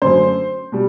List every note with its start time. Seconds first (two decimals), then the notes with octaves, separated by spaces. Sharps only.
0.02 F#2 D3 F#3 A3 C5
0.72 B2 G3